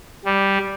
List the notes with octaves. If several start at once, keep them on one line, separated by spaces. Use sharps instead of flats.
G3